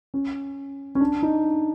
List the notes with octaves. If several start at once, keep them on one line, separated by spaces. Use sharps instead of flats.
C#4
C#4
D4
D#4